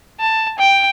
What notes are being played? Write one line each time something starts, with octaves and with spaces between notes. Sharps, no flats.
A5
G5